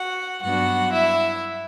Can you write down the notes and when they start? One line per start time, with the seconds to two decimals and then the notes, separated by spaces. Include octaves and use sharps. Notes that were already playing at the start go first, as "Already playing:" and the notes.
Already playing: F#4 F#5
0.42 G2 F#3 B3 D4 F#4 F#5
0.93 E4 E5